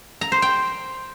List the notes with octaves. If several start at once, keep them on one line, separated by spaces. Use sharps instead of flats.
A#5
C5
G5